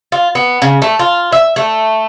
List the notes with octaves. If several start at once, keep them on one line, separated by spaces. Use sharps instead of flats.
F4
B3
C#3
A3
F4
E5
A3